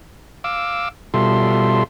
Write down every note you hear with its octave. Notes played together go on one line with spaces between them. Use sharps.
F5 D6 E6
B2 G3 F4 A4 E5 C6